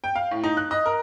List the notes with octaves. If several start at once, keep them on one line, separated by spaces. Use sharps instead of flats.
G5
F5
A2
D#4
F#6
D#5
A#4